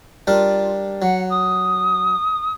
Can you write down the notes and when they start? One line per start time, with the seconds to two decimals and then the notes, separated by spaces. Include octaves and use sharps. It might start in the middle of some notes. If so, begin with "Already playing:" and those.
0.27 G3 D4 F4 A#4
1.02 F#3 F#5
1.30 D#6